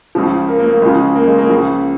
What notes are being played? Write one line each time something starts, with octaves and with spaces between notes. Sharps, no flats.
C#2 C#3 F3
A#4
A#3
A#3
C#2 C#3 F3 G#3
A#3
G#3
A#3
C#2 C#3 F3